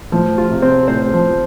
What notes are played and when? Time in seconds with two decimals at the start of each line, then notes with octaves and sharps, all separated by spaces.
0.12 A2 F3
0.38 F4
0.49 C3
0.62 C4
0.88 A2 C5
1.14 F3